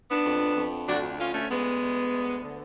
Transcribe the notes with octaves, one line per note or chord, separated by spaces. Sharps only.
B3 D4
F2
F2
D2 D4 F#4
D2 C#4 F4
A3 C#4
D2 G#3 B3
D2
D2
D3